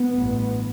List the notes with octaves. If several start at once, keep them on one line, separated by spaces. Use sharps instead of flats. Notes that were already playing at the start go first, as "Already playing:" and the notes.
Already playing: B3
A1 G2